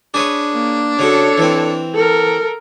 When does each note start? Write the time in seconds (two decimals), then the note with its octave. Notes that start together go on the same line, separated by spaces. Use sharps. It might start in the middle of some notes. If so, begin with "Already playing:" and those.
0.14 D4 G#4 B4 C#5
0.53 A#3
0.99 C#3 F#4 A4 C#5
1.38 E3 C4
1.95 A4 A#4